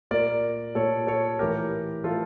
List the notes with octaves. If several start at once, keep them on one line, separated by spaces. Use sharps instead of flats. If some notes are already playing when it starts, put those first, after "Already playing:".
A#2 A#4 D5
A#2 A4 C#5
A4 C#5
A2 E3 G4 A#4
A2 E3 F4 A4